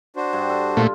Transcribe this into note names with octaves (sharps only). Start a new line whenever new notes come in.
D4 F#4 C5
G2
A4
A#2 A3 F4